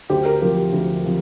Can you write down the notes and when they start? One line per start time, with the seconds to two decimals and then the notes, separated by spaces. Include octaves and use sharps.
0.10 D2 G4 C5
0.25 A#4
0.41 C3 F3 A#4
0.57 G4
0.73 D2
1.04 C3 F3